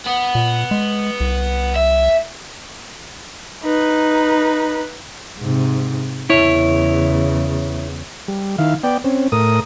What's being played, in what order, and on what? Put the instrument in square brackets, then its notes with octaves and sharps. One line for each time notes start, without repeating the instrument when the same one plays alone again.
[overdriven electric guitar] B3
[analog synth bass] A#2
G#3
C2
[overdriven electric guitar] E5
[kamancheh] D#4 B4
[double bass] G#2 C3
[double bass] E2 C#3 [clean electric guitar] E4 C#5
[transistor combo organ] G3
D#3 E4 F5
B3 D5 G5
C4 C#4
A2 A#4 D#6